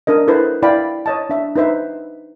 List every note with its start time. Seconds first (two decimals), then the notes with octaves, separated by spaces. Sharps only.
0.07 D4 A#4 D#5
0.28 E4 A4 B4 C5
0.62 E4 D5 F5 G5 B5
1.06 C#5 D#5 A5
1.30 D4 E5
1.56 D#4 B4 C5 E5